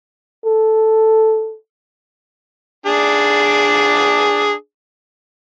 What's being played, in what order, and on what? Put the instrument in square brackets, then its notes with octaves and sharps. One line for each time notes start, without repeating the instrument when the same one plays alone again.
[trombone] A4
[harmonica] D4 G#4 D5